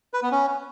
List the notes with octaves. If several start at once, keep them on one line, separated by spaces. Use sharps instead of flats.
B4
B3
C#4